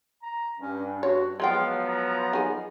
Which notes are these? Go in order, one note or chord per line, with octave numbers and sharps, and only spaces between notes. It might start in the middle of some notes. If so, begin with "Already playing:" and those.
A#5
G2 C#4
F#4 C#5
F3 F#3 G#3 B3 F4 F5 G5
A#5
D#3 G#4